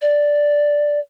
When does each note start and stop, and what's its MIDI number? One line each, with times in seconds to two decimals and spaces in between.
0.02 0.99 74